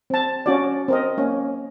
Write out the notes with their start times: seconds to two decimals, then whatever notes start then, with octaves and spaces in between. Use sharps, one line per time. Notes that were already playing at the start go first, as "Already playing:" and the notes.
0.10 C4 A5
0.46 C#4 F#4 D5
0.88 C4 A#4 D#5
1.17 A#3 C#4